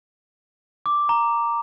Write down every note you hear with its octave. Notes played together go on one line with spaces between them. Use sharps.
D6
A#5